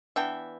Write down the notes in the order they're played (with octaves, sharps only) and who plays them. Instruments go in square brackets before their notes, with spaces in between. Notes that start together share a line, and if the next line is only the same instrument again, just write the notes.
[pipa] E3 B3 D4 E5 G5